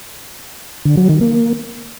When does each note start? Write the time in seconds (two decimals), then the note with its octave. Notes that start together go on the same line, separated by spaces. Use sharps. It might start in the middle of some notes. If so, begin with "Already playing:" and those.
0.85 D3
0.97 F#3
1.09 D#3
1.21 A#3